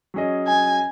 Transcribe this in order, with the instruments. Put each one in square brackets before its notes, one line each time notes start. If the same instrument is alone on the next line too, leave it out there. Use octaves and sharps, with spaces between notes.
[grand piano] F#3 C#4 G#4 D#5
[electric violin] G#5